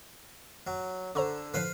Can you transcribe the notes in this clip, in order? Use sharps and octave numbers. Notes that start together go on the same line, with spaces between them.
F#3
D3 C5 A#5 C#6
A2 D3 F3 B4 C5 F5